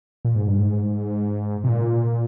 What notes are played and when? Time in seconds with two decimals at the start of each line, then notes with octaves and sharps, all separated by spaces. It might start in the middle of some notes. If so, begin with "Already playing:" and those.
0.25 A#2
0.35 G#2
0.48 G2
0.59 G#2
1.64 C3
1.68 A#2